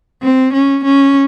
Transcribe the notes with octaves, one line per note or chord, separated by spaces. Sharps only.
C4
C#4
C#4